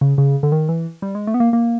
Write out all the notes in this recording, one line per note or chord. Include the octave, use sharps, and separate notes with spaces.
C#3
C#3
D3
D#3
E3
G3
G#3
A3
B3
A#3
A#3